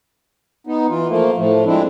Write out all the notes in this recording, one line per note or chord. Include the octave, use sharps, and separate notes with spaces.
B3 D#4
E3 F4
F3 A3 A#3
A2 F3 A3
F3 G#3 C4 D4 E4